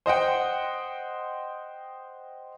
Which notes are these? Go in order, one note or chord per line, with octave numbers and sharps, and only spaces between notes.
C5 D#5 F#5 G5